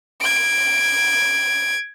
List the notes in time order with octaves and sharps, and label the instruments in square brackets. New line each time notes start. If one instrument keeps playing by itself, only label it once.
[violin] G#6 D7